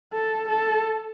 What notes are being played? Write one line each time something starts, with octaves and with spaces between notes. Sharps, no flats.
A4
A4